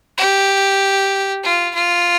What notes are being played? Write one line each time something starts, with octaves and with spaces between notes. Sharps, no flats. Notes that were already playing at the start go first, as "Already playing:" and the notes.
G4
F4
F4